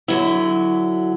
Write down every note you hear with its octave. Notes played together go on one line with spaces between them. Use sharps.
D3 F#3 E4